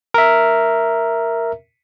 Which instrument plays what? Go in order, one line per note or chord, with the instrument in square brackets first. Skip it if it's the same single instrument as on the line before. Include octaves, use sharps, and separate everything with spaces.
[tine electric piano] A#4 E5